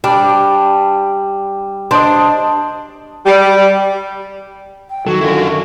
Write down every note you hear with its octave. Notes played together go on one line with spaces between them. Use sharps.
G3 D4
D4 C5 D#5
G3
G5
D#3 F#3 F#4 A4
F#2 D3 E4 F4